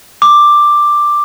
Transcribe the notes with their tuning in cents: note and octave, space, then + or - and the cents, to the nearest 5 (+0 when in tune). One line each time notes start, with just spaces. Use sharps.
D6 +5